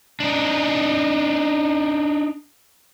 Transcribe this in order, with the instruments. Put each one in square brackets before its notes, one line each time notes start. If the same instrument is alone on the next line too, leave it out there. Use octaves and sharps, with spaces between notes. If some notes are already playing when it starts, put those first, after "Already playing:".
[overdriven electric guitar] D4 D#4